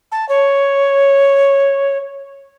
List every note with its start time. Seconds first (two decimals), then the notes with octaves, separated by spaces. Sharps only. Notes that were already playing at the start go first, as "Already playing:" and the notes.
0.12 A5
0.29 C#5